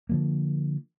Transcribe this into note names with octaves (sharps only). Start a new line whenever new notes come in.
D3 F3 A#3